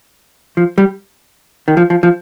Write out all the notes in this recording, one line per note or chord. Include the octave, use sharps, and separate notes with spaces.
F3
G3
D#3
F3
F3
F3